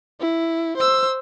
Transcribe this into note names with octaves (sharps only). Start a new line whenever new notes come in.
E4
C5 E6